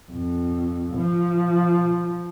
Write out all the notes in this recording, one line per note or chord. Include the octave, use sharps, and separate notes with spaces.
F2
F3